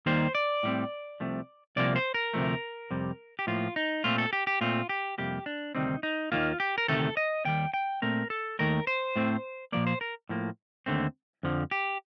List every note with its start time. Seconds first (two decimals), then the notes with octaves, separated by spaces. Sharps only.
0.06 D#2 D#3 G3 A#3 C5
0.35 D5
0.63 A2 G3 C4
1.20 C2 C3 F3 A3
1.76 C2 C3 F3 A#3 D5
1.96 C5
2.14 A#4
2.34 D2 C3 F3 A3
2.91 F2 C3 G3
3.39 G4
3.47 A2 F3 A#3 F4
3.76 D#4
4.04 A#2 A3 C4 F4
4.18 A4
4.33 G4
4.47 G4
4.61 A#2 A3 C4 F4
4.89 G4
5.18 F2 C3 G3 A#3 G4
5.46 D4
5.75 D2 C3 D#3 G3 C4 D#4
6.03 D#4
6.32 D#2 D#3 A#3 F4
6.60 G4
6.78 A#4
6.88 D2 C3 D#3 A3 A4
7.17 D#5
7.45 D#2 D#3 G3 G5
7.74 G5
8.02 A#2 A3 C4 A#4
8.30 A4
8.59 D#2 D#3 A3 A#4
8.87 C5
9.16 A2 A3 C4
9.72 A#2 F3 A#3 D5
9.87 C5
10.01 A#4
10.29 A2 F3 A#3
10.86 D#2 D3 A3 C4
11.43 F2 D3 F3
11.71 G4